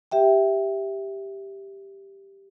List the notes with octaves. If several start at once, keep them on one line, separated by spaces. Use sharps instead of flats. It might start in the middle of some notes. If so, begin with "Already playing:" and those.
G4 E5 G5